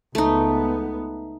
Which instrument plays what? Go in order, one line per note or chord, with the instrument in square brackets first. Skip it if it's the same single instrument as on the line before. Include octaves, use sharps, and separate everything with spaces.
[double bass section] C#2 B3 [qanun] A3 D#4